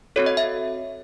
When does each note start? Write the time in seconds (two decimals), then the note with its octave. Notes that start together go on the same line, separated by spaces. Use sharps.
0.16 C4 F#4 A4 C#5
0.26 D#5
0.37 E5